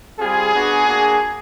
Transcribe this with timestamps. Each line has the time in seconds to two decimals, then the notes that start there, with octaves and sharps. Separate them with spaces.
0.20 G3 C4 F4 G#4
0.53 B3 D4 F#4
0.86 A#3 D4 F#4